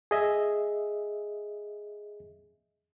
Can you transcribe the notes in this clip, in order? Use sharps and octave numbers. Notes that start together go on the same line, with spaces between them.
G#4 D#5 E5